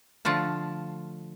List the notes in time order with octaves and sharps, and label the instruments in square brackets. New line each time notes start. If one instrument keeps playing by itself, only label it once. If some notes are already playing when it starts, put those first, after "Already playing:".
[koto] D3 F3 A3 F4 A5